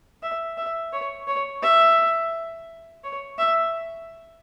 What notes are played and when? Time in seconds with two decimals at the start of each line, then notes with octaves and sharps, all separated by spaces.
0.23 E5
0.58 E5
0.93 C#5
1.27 C#5
1.63 E5
3.04 C#5
3.39 E5